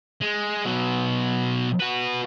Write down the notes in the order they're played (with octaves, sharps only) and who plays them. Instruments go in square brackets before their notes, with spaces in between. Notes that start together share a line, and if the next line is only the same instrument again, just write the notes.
[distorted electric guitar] G#3
B2 F#3
F#4 B4